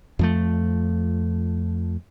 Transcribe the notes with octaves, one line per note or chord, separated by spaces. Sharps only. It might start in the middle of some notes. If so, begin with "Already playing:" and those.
F2 F3 A3